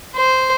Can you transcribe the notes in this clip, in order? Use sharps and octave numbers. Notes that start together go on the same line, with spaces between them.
C5